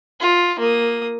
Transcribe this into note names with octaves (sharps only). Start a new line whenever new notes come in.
F4
A#3 D#6